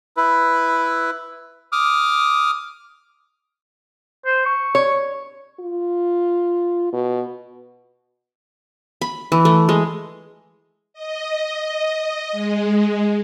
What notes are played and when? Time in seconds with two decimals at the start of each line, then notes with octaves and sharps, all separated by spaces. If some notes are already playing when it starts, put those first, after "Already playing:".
0.17 E4 B4
1.72 D6 D#6 F6
4.26 C5
4.46 C#6
4.75 C#5
5.60 F4
6.93 B2
9.01 B5
9.32 E3
9.45 A3
9.69 G#3
10.94 D#5
12.32 G#3